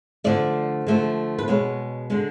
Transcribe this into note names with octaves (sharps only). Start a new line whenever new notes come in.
D3 F3 A3 D5
D3 F3 A3
B4
B2 G#3 B3 C#5
D3 G#3 B3